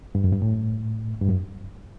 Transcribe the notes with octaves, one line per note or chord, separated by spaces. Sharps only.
G2
F#2
G2
A2
G2
F#2